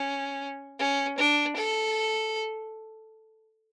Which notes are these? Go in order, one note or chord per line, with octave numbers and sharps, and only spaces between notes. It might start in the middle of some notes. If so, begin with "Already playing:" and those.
Already playing: C#4
C#4
D4
A4